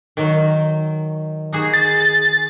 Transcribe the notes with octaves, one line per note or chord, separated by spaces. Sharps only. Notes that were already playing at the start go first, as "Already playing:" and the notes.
D#3 F#3
D#4 F#4 G#4
A6